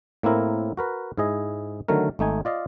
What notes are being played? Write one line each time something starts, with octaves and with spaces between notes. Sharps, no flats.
A2 A#3 C4 E4 A#4
F#4 A#4 B4
G#2 E4 G#4 D#5
D3 D#3 F#3 A3 A#4
G#1 A3 D#4 G#5
F4 D5 D#5 F5